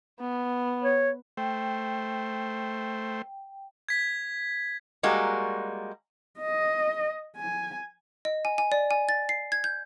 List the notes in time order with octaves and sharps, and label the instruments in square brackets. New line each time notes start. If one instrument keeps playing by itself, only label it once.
[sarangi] B3
[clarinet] C#5
[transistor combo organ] A3 C5 [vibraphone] G5
[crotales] G#6 B6
[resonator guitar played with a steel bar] G3 G#3 A#3 F#4
[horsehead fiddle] D#5
G#5
[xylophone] D#5
G#5
G#5
D5
G#5
A6
C7
G#6
G6